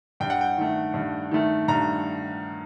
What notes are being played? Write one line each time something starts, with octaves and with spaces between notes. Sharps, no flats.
G2 G5
F#5
G5
D#3 A3
G2
D#3 A3
G2 A#5